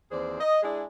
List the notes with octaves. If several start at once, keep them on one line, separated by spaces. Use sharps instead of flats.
D#2 E3 C4 G#4 C5 D5
D#5
G#3 D4 E4 G#4